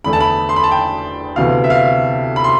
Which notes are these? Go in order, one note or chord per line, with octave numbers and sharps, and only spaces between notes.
E2 D3 A3 B5
A5
B5
C6
B5
A5
G5
D2 C3 E3 B3 F5
E5
F5
B5
C6